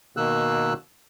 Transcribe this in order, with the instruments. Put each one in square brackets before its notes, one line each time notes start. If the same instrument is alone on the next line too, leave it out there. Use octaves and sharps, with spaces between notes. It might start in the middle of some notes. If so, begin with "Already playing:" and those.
[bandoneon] B2 D#3 A#3 E6 F#6